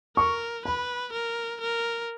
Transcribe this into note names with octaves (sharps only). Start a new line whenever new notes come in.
A#4 C#6
B4 B5
A#4
A#4